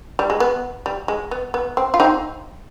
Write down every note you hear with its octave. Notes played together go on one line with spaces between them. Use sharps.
G3
G#3
B3
G3
G#3
B3
B3
C4
F4
C4 D#4